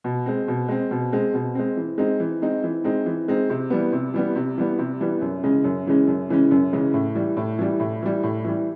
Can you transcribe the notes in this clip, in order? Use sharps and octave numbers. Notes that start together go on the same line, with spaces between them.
B2
G#3 C4
B2
G#3 C4
B2
G#3 C4
B2
G#3 C4
E3
G#3 C4 D#4
E3
G#3 C4 D#4
E3
G#3 C4 D#4
E3
G#3 C4 D#4
C3
E3 G3 B3
C3
E3 G3 B3
C3
E3 G3 B3
C3
E3 G3 B3
F#2
C#3 E3 G#3 C#4
F#2
C#3 E3 G#3 C#4
F#2
C#3 E3 G#3 C#4
F#2
C#3 E3 G#3 C#4
A2
E3 G3
A2
E3 G3
A2
E3 G3
A2
E3 G3